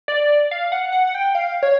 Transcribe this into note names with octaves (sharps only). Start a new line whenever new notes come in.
D5
F5
F#5
F#5
F#5
G5
F5
C#5